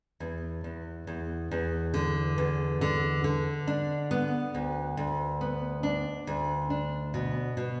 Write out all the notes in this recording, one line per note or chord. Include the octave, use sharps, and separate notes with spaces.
E2
E2
E2
E2
D3
E2
D3
D3
D4
B3
D2
D2
B3
D4
D2
D4
B2
B2